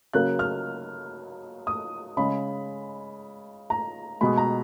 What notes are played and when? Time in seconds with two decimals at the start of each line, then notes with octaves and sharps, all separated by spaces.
0.13 C#3 F#3 A#3 F#6
0.39 F6
1.67 D#6
2.17 C#3 G#3 B5
3.70 A#5
4.21 B2 G#3 B5
4.37 A#5